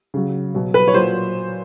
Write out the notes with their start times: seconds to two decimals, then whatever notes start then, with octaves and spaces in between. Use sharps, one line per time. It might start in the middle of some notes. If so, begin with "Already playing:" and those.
0.14 C#3 F#3
0.54 B2 F#3
0.74 B4
0.88 C#5
0.94 A#2 F#3 C5